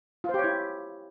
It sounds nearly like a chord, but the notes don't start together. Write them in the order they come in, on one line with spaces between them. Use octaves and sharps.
F4 C5 G4 C#5 E4